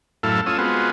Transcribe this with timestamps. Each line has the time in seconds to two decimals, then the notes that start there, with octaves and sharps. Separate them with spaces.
0.23 F#2 A2 E4 A4 F5
0.46 A3 C#4 F4 D#6 E6
0.58 G#3 B3 C4 F4 F#4